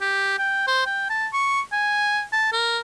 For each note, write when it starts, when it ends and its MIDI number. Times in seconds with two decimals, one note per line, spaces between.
0.01 0.34 67
0.39 0.66 79
0.67 0.86 72
0.86 1.07 79
1.10 1.27 81
1.33 1.61 85
1.72 2.23 80
2.32 2.48 81
2.52 2.80 70